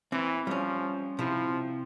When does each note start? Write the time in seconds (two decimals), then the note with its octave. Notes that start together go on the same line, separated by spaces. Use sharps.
0.12 E3 C4
0.47 F3 G3 C#4
1.19 C3 F3 E4